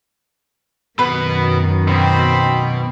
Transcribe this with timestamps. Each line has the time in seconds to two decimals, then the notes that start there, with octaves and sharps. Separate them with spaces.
0.99 F#2 B2 D#3 B3 B4
1.88 B2 C4 G5 B5